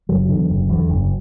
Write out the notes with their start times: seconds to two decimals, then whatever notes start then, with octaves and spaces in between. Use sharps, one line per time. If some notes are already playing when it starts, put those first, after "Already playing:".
0.09 F#1 F#3
0.29 E2 D3
0.49 F#1
0.69 E2 D3
0.89 F#1